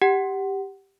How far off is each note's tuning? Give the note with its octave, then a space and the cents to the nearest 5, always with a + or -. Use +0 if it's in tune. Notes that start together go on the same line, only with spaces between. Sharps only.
G4 +0 F#5 +20